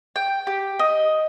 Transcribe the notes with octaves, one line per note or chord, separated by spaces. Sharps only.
G5
G4
D#5